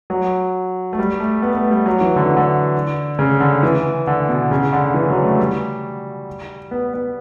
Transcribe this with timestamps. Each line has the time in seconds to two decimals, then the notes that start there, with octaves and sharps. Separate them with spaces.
0.10 F#3
0.93 A3
0.99 G3
1.20 A3
1.42 B3
1.53 B3
1.57 A3
1.71 G3
1.86 F#3
2.01 E3
2.16 D3
2.26 E3
2.37 D3
3.19 C#3
3.40 D3
3.63 E3
4.07 D3
4.29 B2
4.51 C#3
4.73 D3
4.94 E3
5.10 F#3
5.24 A3
5.39 G3
6.71 B3
6.94 B3